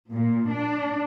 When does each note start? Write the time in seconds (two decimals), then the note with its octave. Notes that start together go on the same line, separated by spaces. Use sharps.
0.12 A#2
0.51 D4